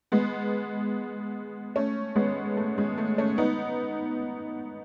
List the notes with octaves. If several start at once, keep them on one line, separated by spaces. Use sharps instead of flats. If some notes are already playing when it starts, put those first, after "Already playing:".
G#3 B3
A3 C#4
G#3 B3
A3
G#3
A3
A3 C#4
B3 D#4